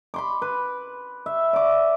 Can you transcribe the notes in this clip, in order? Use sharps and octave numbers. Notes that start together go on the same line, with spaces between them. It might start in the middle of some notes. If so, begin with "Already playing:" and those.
B5 C6 D6
B4
E5
D5 D6